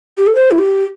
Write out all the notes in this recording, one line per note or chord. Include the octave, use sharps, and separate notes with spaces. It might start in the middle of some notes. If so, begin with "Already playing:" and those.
G4
A4
C5
E4
G4